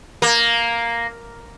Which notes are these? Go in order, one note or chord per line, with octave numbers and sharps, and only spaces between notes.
A#3